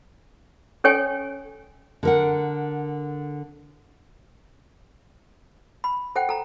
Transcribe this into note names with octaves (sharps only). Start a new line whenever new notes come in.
C#4 A4 C#5 G5 G#5
D3 A#4 F#5
B5
A4 C5 F#5 G5
A4 A#5